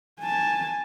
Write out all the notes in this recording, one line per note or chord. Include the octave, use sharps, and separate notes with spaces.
G#5 A5